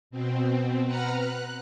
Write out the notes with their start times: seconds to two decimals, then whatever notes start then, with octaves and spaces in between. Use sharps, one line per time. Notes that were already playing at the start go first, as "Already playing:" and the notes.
0.11 B2 C4
0.85 B4 F#5 A#5 F6
1.16 F#6